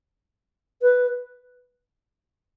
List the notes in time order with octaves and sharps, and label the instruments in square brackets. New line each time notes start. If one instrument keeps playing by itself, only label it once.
[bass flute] B4